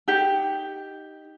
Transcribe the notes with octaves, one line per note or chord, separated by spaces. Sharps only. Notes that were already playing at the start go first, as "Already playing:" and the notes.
D#4 G4